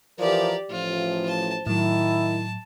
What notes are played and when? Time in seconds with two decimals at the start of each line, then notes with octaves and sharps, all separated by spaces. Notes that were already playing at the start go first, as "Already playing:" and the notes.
0.19 E3 F3 G4 A#4 D5
0.70 A1 A2 F3 F4
1.28 C5 A5
1.67 A2 D#3 F#3 E4 A5